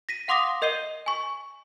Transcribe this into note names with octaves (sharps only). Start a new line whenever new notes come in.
A#6 B6 D#7
F5 F#5 C6 D6 D#6 A#6
A#4 D#5 G6 C7 D#7 G7
G#5 C#6